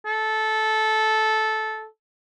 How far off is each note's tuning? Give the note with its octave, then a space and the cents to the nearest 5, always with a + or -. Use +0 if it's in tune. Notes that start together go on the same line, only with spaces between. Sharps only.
A4 -15